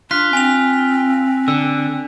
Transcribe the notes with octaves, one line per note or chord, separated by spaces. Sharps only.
D4 F4 F#6 B6
C4 G#5 F7
D3 E6